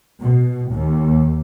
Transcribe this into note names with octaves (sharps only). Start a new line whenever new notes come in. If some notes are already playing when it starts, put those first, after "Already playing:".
B2
D#2